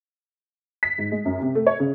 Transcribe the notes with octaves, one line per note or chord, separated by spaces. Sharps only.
B6
G#2
G#3
F#2
C3
A3
C#5
C#3